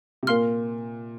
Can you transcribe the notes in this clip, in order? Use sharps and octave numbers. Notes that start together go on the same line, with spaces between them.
C3
A#2 A#4 F5 C6 F6